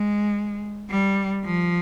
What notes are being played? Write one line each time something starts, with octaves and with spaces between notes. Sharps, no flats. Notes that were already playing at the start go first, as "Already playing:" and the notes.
Already playing: G#3
G3
F3